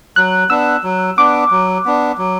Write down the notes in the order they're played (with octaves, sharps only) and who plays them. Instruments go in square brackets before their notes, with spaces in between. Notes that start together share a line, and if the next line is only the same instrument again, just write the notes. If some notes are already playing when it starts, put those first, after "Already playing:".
[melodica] F#3 [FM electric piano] F#6
[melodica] B3 D4 [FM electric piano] E6
[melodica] F#3
[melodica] B3 D4 [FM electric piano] D6
[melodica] F#3
B3 D4
F#3